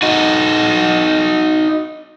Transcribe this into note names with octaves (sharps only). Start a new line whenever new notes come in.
D#4 F#4